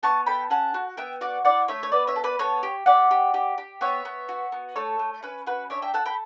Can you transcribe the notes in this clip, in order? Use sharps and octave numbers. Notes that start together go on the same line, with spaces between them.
B3 A5 C#6
A4 G5 B5
C#4 F#5 A5
F#4
B3 E5 G5
F#4 D5 F#5
E4 D5 F#5
A3 C#5 E5
C#5
B3 B4 D5
C#5 E5
A4
B4 D5
B3 A4 C#5
G4
G4 D5 F#5
G4
G4
G4
B3 C#5 E5
B3
F#4
B3
A3 A4 C#5
A3
C#4 B4
F#4 B4
D4 C#5 E5
E5 G5
A4 F#5 A5
G5 B5